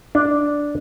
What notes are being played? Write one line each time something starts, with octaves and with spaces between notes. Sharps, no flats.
D4